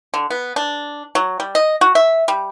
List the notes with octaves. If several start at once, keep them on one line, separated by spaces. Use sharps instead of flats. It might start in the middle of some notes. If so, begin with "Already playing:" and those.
D3
B3
D4
F#3
G3
D#5
F#4
E5
G3